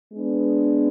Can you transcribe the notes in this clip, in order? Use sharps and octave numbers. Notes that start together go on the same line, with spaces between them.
G#3 B3 D4